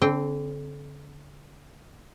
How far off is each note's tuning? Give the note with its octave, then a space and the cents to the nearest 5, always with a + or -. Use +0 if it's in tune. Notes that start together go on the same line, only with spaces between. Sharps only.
D3 -35 C4 +0 G5 +0